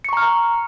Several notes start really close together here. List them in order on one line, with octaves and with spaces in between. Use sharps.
C#7 C#6 A#5 F6